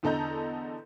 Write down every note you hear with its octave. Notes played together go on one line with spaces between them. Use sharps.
E2 D3 A4 D#5 A#5 G6